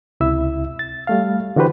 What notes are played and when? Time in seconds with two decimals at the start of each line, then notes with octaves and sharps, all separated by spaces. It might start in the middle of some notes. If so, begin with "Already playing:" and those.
0.20 C#2 C3 E4 E5 E6
0.79 A6
1.07 G3 A3 F5
1.56 D3 E3 F#4 G4 B4 C5